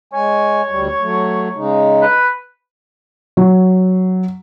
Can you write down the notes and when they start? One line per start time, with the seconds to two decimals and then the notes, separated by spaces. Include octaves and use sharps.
0.13 G#3 C#5 G#5
0.69 D2 G3
1.01 F#3 A3
1.56 C#3 G#3 D#4
2.02 B4
3.37 F#3